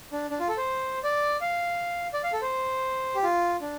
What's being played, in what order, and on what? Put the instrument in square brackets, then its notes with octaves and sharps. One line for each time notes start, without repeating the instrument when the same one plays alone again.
[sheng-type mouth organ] D4
D4
F4
A4
C5
D5
F5
D5
F5
A4
C5
G4
F4
D4